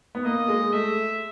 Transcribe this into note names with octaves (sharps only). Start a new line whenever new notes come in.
B3
A#3 D#5
G#3
A3 E5